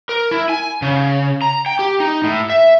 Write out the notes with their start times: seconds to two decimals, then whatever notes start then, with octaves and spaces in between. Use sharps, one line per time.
0.09 A#4
0.31 E4
0.49 G#5
0.82 C#3
1.42 A#5
1.66 G5
1.79 G4
2.00 D#4
2.24 A2
2.50 E5